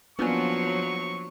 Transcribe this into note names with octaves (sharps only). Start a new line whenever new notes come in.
F3 F#3 A#3 B3 C#4 D4 F4 C#6